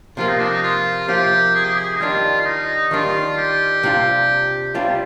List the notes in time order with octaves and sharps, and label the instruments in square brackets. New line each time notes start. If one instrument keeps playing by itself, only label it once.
[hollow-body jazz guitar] C3 F3 A#3 [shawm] F4
[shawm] D#4
D4
D#4
F4
[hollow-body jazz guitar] C3 F3 A#3 [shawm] G4
[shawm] G#4
G4
G#4
D#4
[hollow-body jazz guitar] D#3 G3 D4 [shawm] F4
[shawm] F4
D#4
[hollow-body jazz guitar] D#3 G3 D4 [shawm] F4
[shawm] G4
[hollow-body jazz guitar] C3 G3 D4 F4
C3 G3 D4 F4